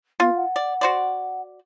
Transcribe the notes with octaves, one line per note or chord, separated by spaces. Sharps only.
B3 F4
F#5
D5
F#4 C5 D5